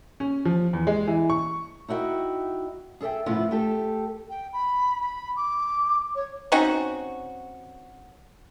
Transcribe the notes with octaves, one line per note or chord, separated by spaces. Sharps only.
C#4
F3
E2
G#3
E3
C#6
D#4 E4 F#4 D#5 G5
G#4 A4 C#5 E5 G5
A2 C#3 F3 B3 E4 F4
A3 G4 A4
G5
B5
B5
D6
C#5
C4 C#4 D#4 F#4